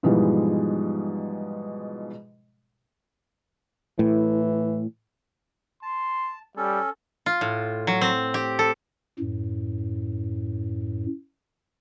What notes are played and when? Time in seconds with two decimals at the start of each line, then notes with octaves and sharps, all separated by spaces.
0.03 G#2 B2 E3 F3 G3 G#3
3.99 A2 E3
5.83 A5 C6
6.57 G3 C#4 A4
7.26 F4
7.41 A2
7.87 F#3
8.01 C4
8.34 G4
8.59 A4
9.19 F#2 A2